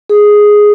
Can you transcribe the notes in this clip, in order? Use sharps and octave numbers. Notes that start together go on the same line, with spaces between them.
G#4